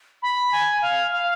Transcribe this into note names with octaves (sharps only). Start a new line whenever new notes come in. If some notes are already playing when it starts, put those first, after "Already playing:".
B5
G#5
F5
F5